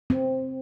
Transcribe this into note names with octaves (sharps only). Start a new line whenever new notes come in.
C4